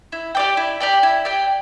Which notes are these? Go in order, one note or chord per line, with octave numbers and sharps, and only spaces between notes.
E4
G4 D5 G5
E4
G4 D5 G5
E4
G4 D5 G5